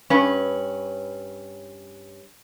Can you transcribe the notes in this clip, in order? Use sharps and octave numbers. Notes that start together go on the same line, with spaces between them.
G2 C#4 B4